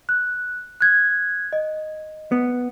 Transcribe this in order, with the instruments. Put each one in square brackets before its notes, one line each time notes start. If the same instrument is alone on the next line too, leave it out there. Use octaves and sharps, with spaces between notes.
[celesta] F#6
F#6 G#6
D#5
[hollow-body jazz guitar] B3